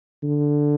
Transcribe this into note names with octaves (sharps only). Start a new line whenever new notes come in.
D3